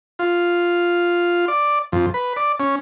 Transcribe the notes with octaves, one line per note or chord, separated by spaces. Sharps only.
F4
D5
F2
B4
D5
C#4